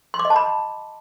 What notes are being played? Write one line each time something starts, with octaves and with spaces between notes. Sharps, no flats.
C6
D6
D#5
A5
B5